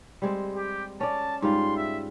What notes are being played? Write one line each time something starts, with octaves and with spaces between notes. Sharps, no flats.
G3 G#3 C4
G4
C#4 D5 A5
G#2 G3 F4 C6
E5